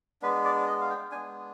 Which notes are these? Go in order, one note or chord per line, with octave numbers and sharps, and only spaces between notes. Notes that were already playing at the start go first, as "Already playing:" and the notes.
G#3 B3 D4 B4
D5
D#5
F5
G5
G#3 B3 D4 G#5